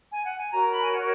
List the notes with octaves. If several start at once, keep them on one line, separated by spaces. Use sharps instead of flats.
G#5
F#5
G#5
F#4 A#4 C#5 A#5
B5
G#5
F#5